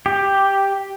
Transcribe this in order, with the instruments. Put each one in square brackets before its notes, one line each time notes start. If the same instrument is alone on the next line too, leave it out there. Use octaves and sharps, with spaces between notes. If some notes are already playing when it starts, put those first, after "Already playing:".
[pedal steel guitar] G4